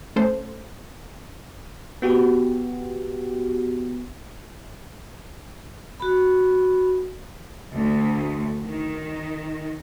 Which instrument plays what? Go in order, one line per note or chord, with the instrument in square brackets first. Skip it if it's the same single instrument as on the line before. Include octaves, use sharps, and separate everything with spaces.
[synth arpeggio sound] A3 C#4 A4 C5
[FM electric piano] B3 F#4 G4
[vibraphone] F#4 B5
[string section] D2
D#3